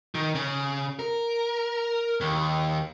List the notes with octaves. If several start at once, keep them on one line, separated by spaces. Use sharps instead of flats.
D#3
C#3
A#4
D#2